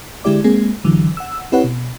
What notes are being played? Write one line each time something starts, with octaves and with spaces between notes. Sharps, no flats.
D3 G#3 E4 G4 D5 D6
G#3 A#3 C4 G#4
G1 D3 E3 F#3
F#5 E6
C4 E4 G4 B4 C#5 F#5
B2